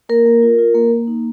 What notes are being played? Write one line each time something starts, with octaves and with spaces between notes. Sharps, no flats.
A#3 A#4
A#3
F4
F4
A#3
A#3
D#4